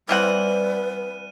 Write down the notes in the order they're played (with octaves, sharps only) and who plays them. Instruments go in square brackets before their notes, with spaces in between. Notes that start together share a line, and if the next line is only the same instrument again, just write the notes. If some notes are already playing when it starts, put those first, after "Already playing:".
[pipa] E3 C4 F#5 [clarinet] G3 [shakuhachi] B4 [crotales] F6 D#7